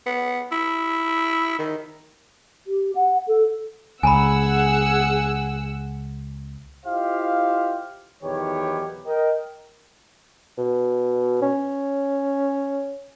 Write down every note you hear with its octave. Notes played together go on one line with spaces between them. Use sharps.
B3
E4
D#3
G4
F#5
A4
C#2 G#4 F#5 G#5 A#5 B5 E6
E4 F4 G4 C5 D#5 F5
B1 E2 D#3 G4 B4 C#5
A#4 D#5 G5
B2
C#4